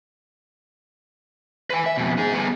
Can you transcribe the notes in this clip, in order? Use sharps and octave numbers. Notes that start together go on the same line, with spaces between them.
B4 G#5
E5
F2 B2
D#4 G#4
G3 B3